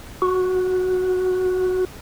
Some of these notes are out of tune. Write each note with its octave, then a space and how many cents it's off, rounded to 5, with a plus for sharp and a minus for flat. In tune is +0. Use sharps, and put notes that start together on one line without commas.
F#4 -5